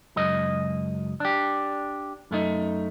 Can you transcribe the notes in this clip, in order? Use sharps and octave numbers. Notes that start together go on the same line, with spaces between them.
C#2 F#2 D#5
D4 G4
F#2 A3 D#4